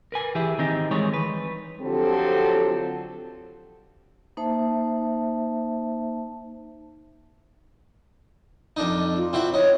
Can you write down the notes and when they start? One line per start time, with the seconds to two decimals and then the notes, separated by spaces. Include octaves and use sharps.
0.12 A#4 B4 G#5
0.35 E3 G4 G#4 E5
0.59 D#3 C4 D#4 G4
0.91 E3 G3 G#3 G#4 A#4 C#5
1.14 B4
1.82 D3 F3 F#3 C4 G4 A4
4.37 A#3 D#4 C5 E5 A5
8.77 F2 D4 D#4
9.17 F4
9.33 C4 E4 F#4
9.54 D#4 C#5